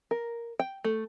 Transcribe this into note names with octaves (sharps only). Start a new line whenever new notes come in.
A#4
G5
A3